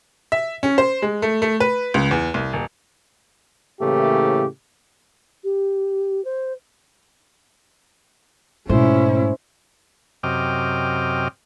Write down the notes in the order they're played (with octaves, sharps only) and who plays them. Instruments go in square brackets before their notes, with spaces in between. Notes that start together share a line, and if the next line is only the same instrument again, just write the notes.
[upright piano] E5
C#4
C5
G#3
A3
A3
B4
C#2
E2
C2
D#1
[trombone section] A2 C#3 E3 A3 A#3 G4
[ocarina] G4
C5
[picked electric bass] G#2 G#3 A3 [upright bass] B2 [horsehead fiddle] C#4 E4 [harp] C5
[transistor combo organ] F#2 C3 D#5 G5 D6 F6